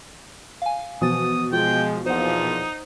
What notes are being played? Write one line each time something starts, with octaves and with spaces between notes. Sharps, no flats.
F5 G#5
B2 E3 F3 D#6 A6
F3 G#3 F4 G5
E2 A#2 F3 D#4 C5 F#5